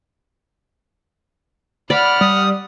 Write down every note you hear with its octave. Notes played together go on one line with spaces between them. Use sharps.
D5 F#5 B5 F6
G3 D#6